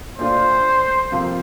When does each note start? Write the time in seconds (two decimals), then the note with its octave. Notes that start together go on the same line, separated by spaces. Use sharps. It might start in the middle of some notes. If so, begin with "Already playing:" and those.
0.18 A#2 A3 D4 F4 C5
1.12 F2 C3 F3 A#3 F4